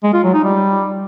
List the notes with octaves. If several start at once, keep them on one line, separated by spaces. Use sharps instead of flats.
G#3
F4
F#3
D#4
G3